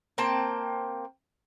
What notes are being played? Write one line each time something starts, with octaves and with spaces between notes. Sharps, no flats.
A#3 C4 G5 A5